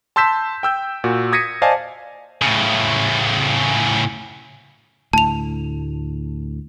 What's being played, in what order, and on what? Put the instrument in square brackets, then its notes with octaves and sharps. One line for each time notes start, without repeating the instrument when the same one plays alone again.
[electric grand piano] A5 C6 E6 G6 B6 E7
G5 E6 G6
A#2 F#4
D#6 G#6 A#6 B6 C#7 D#7
C5 D5 D#5 F5 G#5 A5
[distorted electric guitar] A2 C#3
[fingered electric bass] D2 A2 [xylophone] A5 F7